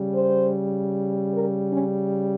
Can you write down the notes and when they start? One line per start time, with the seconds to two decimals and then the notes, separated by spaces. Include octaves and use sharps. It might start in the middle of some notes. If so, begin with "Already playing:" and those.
Already playing: C#3 G3
0.14 C5
1.33 A#4
1.71 C#4